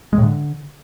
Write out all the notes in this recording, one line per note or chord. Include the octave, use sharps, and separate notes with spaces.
G#3
A2
D3